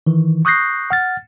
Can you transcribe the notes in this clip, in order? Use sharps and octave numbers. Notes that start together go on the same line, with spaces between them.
D#3 E3
C#6 D#6 F#6 G6 A#6 C7
F#5 F6 A6